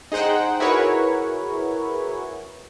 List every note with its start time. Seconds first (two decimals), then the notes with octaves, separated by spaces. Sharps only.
0.12 D#4 G#4 C5 F#5 G5
0.60 E4 F#4 G#4 A#4 B4 C#5